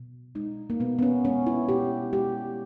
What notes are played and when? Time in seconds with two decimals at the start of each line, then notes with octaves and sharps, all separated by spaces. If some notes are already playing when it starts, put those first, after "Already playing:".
Already playing: B2
0.35 G#3 D#4
0.70 A#3
0.80 B2 B3
0.99 B3
1.02 C#4
1.25 G#3 C#4
1.47 E4
1.69 B2 G4
2.13 G#3 G4